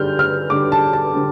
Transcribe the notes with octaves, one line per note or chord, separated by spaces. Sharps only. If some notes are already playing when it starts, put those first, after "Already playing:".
Already playing: D3 G3 D4 F6 G6
F6
D3 G3 D4 D6
A5
A5
D3 G3